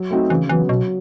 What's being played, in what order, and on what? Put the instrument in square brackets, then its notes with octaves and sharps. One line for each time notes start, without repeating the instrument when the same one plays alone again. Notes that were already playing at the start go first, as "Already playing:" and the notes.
Already playing: [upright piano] F#3
A3 C4 D#4 F#4
[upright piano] C#3 [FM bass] E3
[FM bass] E3 [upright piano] F#3 B3
[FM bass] B2 [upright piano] F#3